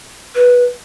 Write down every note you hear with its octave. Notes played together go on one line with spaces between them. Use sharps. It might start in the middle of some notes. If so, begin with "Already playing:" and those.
B4